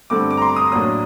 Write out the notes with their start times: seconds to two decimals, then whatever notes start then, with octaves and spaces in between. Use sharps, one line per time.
0.10 G2 D3 A3 C4 D6
0.31 D6
0.37 A#5
0.42 C6
0.56 D#6
0.72 A2 F#3 A#3 D4 D#6